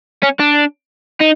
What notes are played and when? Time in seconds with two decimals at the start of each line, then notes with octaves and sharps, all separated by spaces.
0.23 C#4
0.40 D4
1.20 D#4